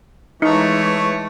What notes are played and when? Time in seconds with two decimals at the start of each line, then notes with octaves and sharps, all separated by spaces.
0.42 E3 G#3 A3 D#4 C#5